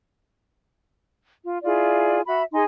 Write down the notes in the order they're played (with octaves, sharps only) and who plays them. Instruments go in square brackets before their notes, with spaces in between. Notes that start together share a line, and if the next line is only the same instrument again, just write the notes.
[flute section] F4
E4 F4 G#4 D5
F#4 E5 B5
D#4 G#4 G#5 C6